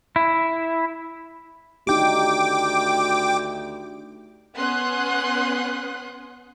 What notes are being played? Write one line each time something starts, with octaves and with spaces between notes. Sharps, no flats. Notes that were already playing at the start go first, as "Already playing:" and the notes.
E4
D2 D#4 G4 G5 D6
B3 C#4 F#5 C6 D#6 F#6